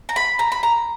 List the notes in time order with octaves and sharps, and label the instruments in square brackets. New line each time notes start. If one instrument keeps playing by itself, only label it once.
[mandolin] A#5
B5
A#5
B5
A#5